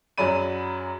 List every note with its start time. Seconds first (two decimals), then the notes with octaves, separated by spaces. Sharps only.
0.18 F#2 F#3 G#4 D5 B5 D#7